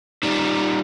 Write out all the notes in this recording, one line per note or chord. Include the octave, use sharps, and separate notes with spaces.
D#3 G3